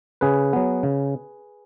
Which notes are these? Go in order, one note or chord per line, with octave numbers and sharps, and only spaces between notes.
C#3 G#4 B4
F#3 B3
C#3